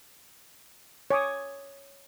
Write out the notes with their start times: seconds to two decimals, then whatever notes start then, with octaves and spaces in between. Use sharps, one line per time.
1.11 C#5 G#5 D6 D#6